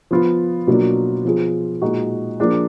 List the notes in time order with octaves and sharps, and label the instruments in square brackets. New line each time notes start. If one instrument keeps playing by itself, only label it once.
[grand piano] F3 B3 F4
B2 F#3 A#3 D4 F4
F3 B3 F4 G#4
A#2 G#3 D#4 F#4
F3 A#3 D4 F4 G#4